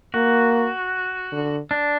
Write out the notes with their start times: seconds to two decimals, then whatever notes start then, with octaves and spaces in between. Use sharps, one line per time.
0.14 A#3 F#4
1.32 D3
1.71 D4